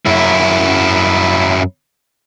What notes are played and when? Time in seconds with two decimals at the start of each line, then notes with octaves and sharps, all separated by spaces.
0.06 F#2 E4